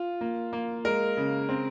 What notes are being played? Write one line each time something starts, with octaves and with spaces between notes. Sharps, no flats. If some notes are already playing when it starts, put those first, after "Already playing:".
Already playing: F4
A#3
A#3
G#3 A#4
C#3
C4